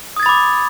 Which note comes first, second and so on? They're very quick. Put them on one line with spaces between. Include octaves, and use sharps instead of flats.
D#6 G#6 A6 B5 D6